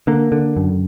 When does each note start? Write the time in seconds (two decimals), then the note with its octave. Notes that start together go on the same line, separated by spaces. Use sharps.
0.07 D3 A#3
0.32 D3
0.57 F#2